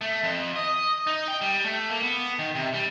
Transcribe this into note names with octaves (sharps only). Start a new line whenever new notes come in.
A3
F2
D#5
D#4
G5
G3
A3
A#3
B3
D#3
C3
G3